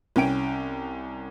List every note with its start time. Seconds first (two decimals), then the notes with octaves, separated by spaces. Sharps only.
0.16 C2 C#4 G5 D7